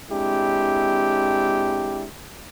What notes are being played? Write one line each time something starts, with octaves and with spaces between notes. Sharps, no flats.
G#3 C4 D4 E4 G4